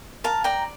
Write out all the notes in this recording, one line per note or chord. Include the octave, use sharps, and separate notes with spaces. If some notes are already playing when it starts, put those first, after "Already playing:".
A#4 F5 A5
D5 G5 A#5